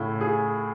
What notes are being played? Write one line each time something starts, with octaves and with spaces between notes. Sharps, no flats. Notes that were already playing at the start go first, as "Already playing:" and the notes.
Already playing: A2 C#3
G#4